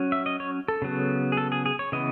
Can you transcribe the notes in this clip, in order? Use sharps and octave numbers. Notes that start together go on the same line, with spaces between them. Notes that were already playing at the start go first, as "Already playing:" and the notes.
Already playing: F#3 C#4
E5
D#5
C#5
A4
C#3 F#3 B3
G#4
A4
G#4
G#4
C#5
C#3 E3 B3 D#5